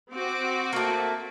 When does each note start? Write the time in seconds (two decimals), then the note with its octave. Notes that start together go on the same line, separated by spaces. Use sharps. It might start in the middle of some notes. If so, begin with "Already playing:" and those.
0.12 C4 F#4 D6
0.73 A3 A#3